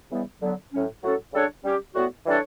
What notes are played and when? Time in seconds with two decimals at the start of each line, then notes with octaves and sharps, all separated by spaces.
0.11 C#3 E3 G3 B3
0.42 D3 F#3 B3
0.72 A2 F#3 C#4
1.03 A2 F#3 C#4 F#4 A4
1.33 C#3 G3 D4 A4 C#5
1.65 G3 C#4 G4
1.95 A2 G3 B3 F#4
2.25 E3 G3 D4 A4 C#5